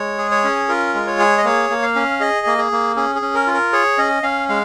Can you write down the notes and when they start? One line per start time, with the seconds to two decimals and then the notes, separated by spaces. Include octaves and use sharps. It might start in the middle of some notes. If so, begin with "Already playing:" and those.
Already playing: G#3 C#5
0.18 G#4
0.31 C#5
0.44 C#4
0.69 F4 A#4
0.94 G#3
1.07 C#5
1.19 G#4
1.38 D#5
1.44 A#3 C#5
1.70 A#3
1.83 F5
1.96 C#4
2.20 G#4 D#5
2.47 A#3
2.58 G#4
2.72 A#3
2.96 C#4 G#4
3.15 G#4
3.22 C#4
3.35 A#4
3.47 F4
3.54 A#4
3.73 G#4 C#5
3.98 C#4 D#5
4.23 C#4 F5
4.49 G#3 F5